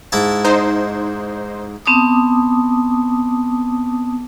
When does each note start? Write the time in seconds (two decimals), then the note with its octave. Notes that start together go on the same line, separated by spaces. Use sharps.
0.12 G#2 E4 A5
0.45 D#4 C5
1.86 B3 C4 A5 D6 D#6